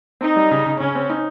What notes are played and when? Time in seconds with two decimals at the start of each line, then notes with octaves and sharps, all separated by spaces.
0.21 C4 D#4
0.36 G3
0.51 C#3
0.66 C#3
0.80 C#3 C#4
0.95 C4
1.10 D#4